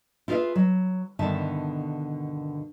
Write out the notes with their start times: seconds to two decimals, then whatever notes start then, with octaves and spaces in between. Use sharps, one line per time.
0.28 E4 F4 G#4 A#4 B4 E5
0.55 F#3
1.19 G2 B2 D3 D#3 E5 A5